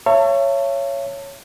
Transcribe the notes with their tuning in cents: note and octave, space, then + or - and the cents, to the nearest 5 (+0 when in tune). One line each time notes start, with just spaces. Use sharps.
C#5 +0 E5 +40 A5 +35